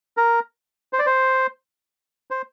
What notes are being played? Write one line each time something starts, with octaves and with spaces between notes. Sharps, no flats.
A#4
C5
D5
C5
C5